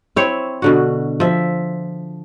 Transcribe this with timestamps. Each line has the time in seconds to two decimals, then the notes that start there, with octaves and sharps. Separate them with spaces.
0.16 C4 E4 C5 C#5
0.62 B2 D3 F#4
1.20 F3 E5